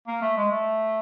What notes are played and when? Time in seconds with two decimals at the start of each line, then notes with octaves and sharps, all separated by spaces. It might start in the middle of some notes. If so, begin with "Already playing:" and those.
0.07 A#3
0.22 A3
0.37 G#3
0.51 A3